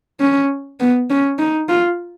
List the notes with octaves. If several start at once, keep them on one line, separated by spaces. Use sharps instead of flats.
C#4
B3
C#4
D#4
F4